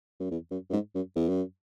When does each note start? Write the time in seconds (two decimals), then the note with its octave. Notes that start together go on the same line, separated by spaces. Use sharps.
0.20 F#2
0.31 E2
0.51 F#2
0.70 F#2
0.73 G#2
0.95 F#2
1.16 E2
1.29 F#2